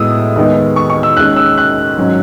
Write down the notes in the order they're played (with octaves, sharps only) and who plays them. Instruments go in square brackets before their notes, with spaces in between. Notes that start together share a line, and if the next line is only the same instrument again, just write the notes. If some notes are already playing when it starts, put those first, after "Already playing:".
Already playing: [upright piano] A2 G#3 B3 D#6 E6
D#2 D#3 G#3 B3
C#6
C#6
E6
D#2 D#3 G#3 C#4 F#6
E6
F#6
G#2 D#3 F#3 C#4